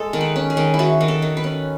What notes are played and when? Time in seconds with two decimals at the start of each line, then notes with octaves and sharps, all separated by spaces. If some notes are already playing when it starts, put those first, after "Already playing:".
Already playing: G#3 A4
0.13 D#3
0.21 B4
0.36 C#4
0.50 G#4
0.57 D#3
0.74 E4
0.79 D#3 F#4
1.01 D#3
1.08 A4
1.22 D#3
1.37 B4
1.44 C#4